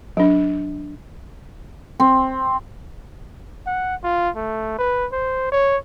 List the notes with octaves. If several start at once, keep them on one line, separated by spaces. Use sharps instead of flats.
F#3 D4
C4
F#5
F4
A3
B4
C5
C#5